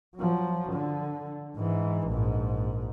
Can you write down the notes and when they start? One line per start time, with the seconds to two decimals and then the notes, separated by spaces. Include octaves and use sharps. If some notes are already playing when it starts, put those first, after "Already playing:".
0.16 F3 F#3
0.73 D3
1.56 G#2 E3
2.08 A#1 G#2